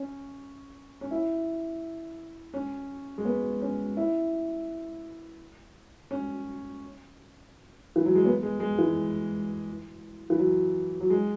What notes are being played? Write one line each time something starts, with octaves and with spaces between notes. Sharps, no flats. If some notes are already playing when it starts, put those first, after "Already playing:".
Already playing: C#4
C#4
E4
C#4
G#3
B3
C#4
E4
C#4
E3
F#3
G#3
B3
G#3
G#3
E3
E3
F#3
F#3
G#3